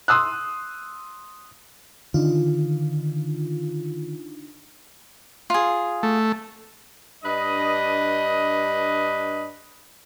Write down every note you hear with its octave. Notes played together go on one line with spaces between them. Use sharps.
C6 D#6 E6 F#6
D3 D#3 D4 D#4 F4
F4 G#4
A3
G2 D4 B4 D#5